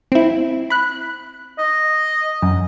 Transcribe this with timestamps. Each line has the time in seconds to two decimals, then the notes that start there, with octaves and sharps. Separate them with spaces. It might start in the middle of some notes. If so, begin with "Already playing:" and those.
0.12 C4 E4
0.70 B5 F#6
1.59 D#5
2.42 F#2